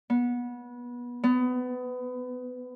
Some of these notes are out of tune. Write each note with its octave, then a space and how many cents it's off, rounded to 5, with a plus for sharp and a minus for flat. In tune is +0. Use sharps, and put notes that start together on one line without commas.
B3 -25
B3 +25